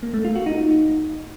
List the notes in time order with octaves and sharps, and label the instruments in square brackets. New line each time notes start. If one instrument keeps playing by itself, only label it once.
[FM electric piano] A#3
A3
F4
F#4
D#4